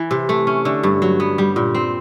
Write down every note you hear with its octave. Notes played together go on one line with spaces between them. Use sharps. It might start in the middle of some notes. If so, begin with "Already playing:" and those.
Already playing: E3
C3
A3
C#4
D3
G2
F#3
B3
G3
A#2
C4